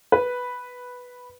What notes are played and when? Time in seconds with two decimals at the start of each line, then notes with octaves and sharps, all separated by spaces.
0.12 B4